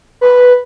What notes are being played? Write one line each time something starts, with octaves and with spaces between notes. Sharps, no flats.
B4